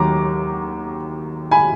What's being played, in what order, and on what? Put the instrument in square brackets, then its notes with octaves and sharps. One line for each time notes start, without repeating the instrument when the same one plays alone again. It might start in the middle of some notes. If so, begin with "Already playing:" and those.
Already playing: [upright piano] D#2 D#3 F#3 A#5 D6
G#5 B5